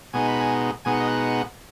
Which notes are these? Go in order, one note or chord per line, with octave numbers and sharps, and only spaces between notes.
B2 G#3 B3 D#4 G#5
B5
G#5
B2 G#3 B3 D#4 G#5
F#5
D#5
F#5